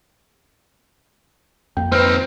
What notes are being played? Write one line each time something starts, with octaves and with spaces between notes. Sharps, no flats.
F2 A#3 G5
C4 D#4 B4 C5 F6